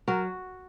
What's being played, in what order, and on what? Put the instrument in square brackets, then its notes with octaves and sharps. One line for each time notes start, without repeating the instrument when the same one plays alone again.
[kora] F#3 F#4 A#4